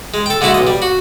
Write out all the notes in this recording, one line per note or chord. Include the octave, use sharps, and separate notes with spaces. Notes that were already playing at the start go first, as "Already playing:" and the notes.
G#3
A4 G5
D3 G#3 A3 E4 F#4
B1 D#5
G3
F#4